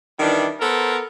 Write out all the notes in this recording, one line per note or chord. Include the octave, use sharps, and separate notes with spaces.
D#3 E3 G3 D4
B3 A4 A#4 C5